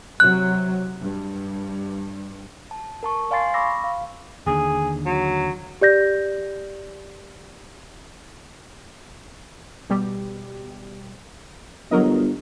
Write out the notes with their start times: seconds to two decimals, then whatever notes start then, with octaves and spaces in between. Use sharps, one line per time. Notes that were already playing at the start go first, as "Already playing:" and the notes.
0.20 C3 F#3 F#6
1.01 G2
2.71 A5
3.03 A#4 A5 C#6
3.31 D5 F5 G#5 C6 A6 C7
3.54 B5 C#6 D6 E6 A#6
3.84 F5
4.47 D#2 D3 G#4
5.05 F#3
5.81 G4 D5 G6 A#6
9.90 B2 G3 G4
11.91 G1 F#3 A#4 D#5